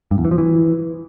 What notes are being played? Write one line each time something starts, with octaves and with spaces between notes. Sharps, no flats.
G2
E2
E3
F3
E3